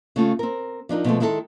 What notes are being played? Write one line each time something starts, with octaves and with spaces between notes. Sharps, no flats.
C#3 A3 F4
C4 A#4
F3 D4 D#4 A#4
B2 F3 G#3 A3
D#3 G#3 E4 F4 A4